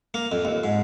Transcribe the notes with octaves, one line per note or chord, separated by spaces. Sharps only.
A#3
F2
D#2
G#2